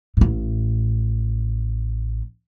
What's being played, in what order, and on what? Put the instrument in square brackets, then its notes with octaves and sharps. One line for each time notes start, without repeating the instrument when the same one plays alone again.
[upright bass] A1 A2